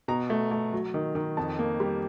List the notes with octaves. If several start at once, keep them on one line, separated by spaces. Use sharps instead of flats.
B2 A#5
A3
A3
F#3
D#3
D#3
F2 A5
A#3
G3